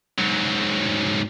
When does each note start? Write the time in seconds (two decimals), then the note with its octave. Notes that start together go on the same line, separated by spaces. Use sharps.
0.19 G#2 F#3